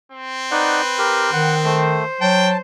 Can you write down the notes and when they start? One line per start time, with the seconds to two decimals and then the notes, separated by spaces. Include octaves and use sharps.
0.12 C4
0.51 D#4 B4 D5 F#5
0.99 G4 A#4
1.33 D#3 F#5
1.64 A3 C5
2.21 F#3 G5 A5